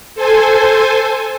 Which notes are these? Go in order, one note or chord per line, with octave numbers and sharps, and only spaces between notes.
A4 C5 G#5